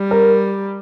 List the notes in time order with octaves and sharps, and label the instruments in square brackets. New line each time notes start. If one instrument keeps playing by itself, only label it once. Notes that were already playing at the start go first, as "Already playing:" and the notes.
Already playing: [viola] G3
[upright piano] A#4